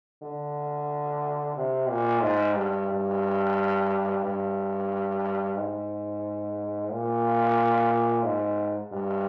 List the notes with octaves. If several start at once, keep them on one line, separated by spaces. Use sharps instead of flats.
D3
C3
A#2
G#2
G2
G2
G2
G#2
A#2
G#2
G2